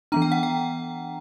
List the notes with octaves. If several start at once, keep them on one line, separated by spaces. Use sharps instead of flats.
E3 B3 D4 A#5
G5
F#5
G5